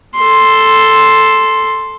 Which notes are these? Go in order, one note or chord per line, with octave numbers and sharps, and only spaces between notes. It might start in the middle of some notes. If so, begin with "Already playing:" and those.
A4 C6